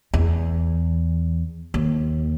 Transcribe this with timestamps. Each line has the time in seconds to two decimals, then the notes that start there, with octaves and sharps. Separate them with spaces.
0.14 E2
1.74 D#2